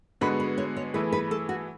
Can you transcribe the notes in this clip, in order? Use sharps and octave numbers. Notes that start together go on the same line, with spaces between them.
D3 G#3 B3 F#4 B4
B4
C#5
C#5
E3 A3 E4 G#4 B4
B4
A4
F#4